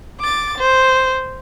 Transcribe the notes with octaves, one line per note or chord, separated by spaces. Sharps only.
D6 A6
C5